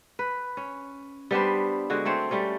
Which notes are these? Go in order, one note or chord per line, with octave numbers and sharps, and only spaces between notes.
B4
C#4
G3 B3 D4 C5
D3 G#3 F#4
A3 C4 C5 C#5
G3 A3 C#4